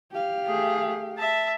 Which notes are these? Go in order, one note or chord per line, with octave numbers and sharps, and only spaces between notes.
G4 F5
A3 G#4
E5 A5